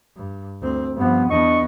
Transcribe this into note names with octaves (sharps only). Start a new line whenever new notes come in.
G2
D2 C4
G2 F3 B3
E2 B3 D4 D#5 C#6